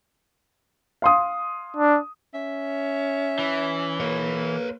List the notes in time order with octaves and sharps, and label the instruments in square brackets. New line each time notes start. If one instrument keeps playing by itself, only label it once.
[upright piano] F5 C6 D#6
[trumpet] D4
[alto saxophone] C#4 [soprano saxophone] E5
[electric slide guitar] E3
[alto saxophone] A#3 [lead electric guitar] B4 C#5